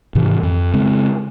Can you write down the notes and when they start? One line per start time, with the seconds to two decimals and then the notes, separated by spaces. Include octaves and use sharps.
0.15 G#2 C3 D#3 E3
0.43 F2
0.74 C#3 G#3 C4